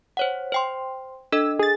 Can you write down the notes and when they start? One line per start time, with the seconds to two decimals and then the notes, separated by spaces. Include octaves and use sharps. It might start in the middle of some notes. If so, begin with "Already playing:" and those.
0.17 C5 C#5 F#5
0.52 C5 G5 C6
1.32 D4 A4 D#5 E6
1.59 G#4 A6